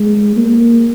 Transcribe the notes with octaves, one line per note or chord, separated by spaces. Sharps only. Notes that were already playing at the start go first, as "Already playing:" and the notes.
Already playing: G#3
A#3